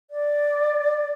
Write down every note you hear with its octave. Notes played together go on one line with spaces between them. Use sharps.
D5